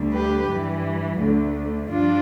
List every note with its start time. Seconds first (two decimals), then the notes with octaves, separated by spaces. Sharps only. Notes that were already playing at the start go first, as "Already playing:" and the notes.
Already playing: D2 D3 G3
0.13 G4 B4
0.48 G2 E3 G3
1.19 D2 D3 A3
1.90 G2 F3 D4 F4